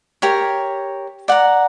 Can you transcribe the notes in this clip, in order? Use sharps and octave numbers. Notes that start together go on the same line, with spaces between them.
G4 A#4 C#5
D5 F#5 A#5